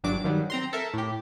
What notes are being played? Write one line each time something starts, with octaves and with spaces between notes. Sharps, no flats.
G1 G2 F#3 D4 D6
G2 D#3 F#3 G3
C4 A#5 C6
A4 A#4 E5
A2 G4